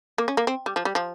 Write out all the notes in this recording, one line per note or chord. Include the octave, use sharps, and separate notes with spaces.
A#3
C#4
A#3
C4
G3
F3
G3
F3